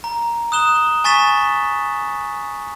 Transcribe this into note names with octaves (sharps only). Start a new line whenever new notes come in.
A#5
D#6 F#6 E7 G7
G#5 C#6 A6 B6 E7 G7